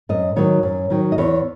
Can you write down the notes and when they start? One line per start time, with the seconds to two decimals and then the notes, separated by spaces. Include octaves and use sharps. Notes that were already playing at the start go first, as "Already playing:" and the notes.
0.09 F#2 D#5
0.36 D#3 F#3 C#5
0.63 F#2
0.90 D#3 F#3
1.12 D#5
1.18 E2 C#5